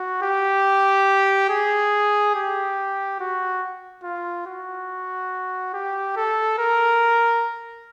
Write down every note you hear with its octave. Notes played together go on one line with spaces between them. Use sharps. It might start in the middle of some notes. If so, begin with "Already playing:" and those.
Already playing: F#4
G4
G#4
G4
F#4
F4
F#4
G4
A4
A#4